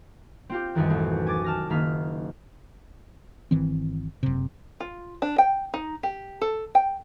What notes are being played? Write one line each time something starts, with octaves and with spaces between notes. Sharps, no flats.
C4 F4 G4
C2 F#2 D#3 E3
A1
G#5 D6 A6
A5 F6 A#6
F#1 D#3 A#3 F6 B6
G1 D#3 E3 C4
F#1 C3
F4
D4
G5
D#4
G4
A4
G5